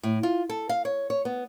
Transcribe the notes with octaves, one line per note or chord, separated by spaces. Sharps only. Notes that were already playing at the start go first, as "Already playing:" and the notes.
A2
F4
A4
F5
C#5
C#5
B3